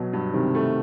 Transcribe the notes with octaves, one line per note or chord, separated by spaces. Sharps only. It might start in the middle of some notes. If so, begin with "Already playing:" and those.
Already playing: B2 F#3
G2
C3 D#3
A3